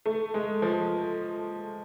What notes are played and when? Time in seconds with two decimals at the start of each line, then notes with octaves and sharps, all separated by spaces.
0.06 A3
0.34 G#3
0.62 F3